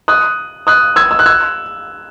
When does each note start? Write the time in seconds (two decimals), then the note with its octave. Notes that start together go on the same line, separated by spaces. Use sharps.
0.08 D#6 F#6
0.67 D#6 F#6
0.96 E6 G#6
1.11 E6
1.19 F#6
1.26 E6 G#6